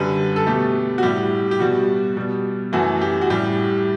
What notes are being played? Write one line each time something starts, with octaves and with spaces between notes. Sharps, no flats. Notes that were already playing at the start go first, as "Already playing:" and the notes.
Already playing: F#2 D3 G3 B4
A4
B2 A3 G4
F#4
A2 G3 G4
G4
B2 G3 F#4
B2 G3
F#2 E3 A3 F#4
G4
F#4
A2 G3 G4